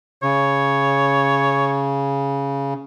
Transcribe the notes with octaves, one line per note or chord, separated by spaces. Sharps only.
C#3 C#5